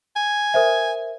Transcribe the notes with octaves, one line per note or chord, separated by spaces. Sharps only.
G#5
A#4 C5 E5